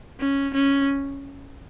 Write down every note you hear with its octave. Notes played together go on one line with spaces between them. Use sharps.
C#4
C#4